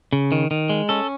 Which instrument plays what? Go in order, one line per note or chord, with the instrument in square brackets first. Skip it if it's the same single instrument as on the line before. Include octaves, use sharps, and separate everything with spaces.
[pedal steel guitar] C#3
D#3
D#3
G#3
C#4 A4